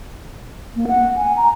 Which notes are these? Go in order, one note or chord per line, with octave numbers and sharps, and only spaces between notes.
A#3
F#5
G#5
A#5